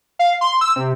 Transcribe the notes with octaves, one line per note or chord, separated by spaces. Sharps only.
F5
C6
E6
C3